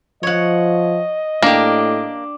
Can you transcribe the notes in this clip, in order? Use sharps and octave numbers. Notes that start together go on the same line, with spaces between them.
F3 C#5 D#5 F#5
A2 A#3 D4 G4